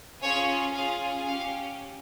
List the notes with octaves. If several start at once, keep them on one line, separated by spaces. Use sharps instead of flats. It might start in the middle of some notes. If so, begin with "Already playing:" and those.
C#4 F4 G#4 C#5
C#4 F4 G#4 F5
C#4 G4 F5